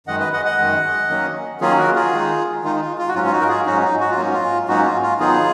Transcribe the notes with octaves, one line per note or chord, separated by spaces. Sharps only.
F#2 D#3 G#3 D#5 F#5
B4 D#5
D#5 F#5
D#5 F#5
F#2 D#3 G#3
D#3 F#3 A#3 C#4
D#3 F#3 A#3 C#4 F4 G#4
F#4 A#4
F4 G#4
D#3 G#3 D#4
D#3 G#3 D#4 F4
D#4
F4
F4
F#4
G#2 F#3 C#4 F4
F4
D#4 F#4
A#4
F4 G#4
G#2 F#3 C#4 D#4 F#4
D#4
F#4
F4
G#2 F#3 A#3 C#4 D#4
F4
G#2 F#3 A#3 C#4 D#4 F#4
F4
F4
D#3 F#3 B3 D#4 F4 G#4